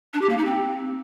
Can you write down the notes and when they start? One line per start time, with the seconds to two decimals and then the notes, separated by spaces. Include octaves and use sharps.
0.14 D4
0.22 G4
0.30 A#3
0.37 D#4
0.45 C4